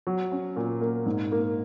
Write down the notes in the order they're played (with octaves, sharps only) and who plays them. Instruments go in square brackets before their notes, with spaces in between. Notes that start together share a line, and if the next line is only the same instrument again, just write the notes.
[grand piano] F#3
C#4
A#2
A#3
G#2
A#3